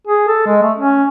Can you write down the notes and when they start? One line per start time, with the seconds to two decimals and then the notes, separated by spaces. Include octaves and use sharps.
0.07 G#4
0.28 A4
0.46 G#3
0.63 A3
0.77 C#4